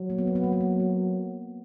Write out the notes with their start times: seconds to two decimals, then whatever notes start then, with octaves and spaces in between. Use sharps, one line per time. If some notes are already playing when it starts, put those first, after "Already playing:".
Already playing: F#3
0.10 A#3
0.18 B3
0.27 A#3
0.36 B3
0.44 A#3
0.52 B3
0.61 A#3
0.80 A#3